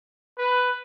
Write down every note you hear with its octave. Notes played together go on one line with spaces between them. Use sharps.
B4